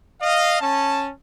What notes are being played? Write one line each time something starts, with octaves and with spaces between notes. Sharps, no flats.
D#5 F5
C#4 A5